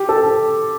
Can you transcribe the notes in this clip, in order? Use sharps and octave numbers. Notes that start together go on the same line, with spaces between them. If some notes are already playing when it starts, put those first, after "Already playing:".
Already playing: G4
A4